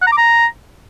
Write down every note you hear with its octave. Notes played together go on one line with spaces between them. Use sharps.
F#5
A#5
D6
A#5